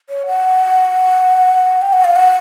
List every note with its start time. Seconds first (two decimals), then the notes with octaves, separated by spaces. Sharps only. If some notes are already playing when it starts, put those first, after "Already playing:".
0.09 C#5
0.27 F#5
1.82 G5
1.93 F#5
2.04 F5
2.16 F#5